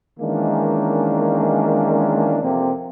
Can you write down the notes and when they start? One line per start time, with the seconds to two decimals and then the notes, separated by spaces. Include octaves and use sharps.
0.20 D#3 E3 G#3 A#3 C#4 D4
2.43 F2 C3 A#3